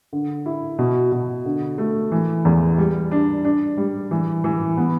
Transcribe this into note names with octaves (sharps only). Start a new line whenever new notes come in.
D3
E4
B2
B2
D3
A3
E3
E2
G3
D4
D4
G3
E3
E3
B3